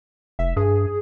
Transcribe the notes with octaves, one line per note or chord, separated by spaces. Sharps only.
F1 E5
G2 G#4